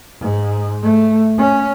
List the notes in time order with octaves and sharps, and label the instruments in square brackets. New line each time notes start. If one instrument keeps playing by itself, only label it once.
[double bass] G#2
A3
C#4